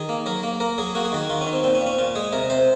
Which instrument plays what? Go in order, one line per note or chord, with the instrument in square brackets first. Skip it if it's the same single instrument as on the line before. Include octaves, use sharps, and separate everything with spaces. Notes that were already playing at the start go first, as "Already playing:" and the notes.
Already playing: [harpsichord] D#3 G#4
A#3
F#3 A#4
A#3
A#3 A#4
F#3 G#4
A#3 F#4
G#4
D#3 F#4
D#3 F4
C#4
D#3
C4
A#2 C4
C#4
A#2
C#4
A#2 F4
G#3 G#4
C3 A#4
C3 C5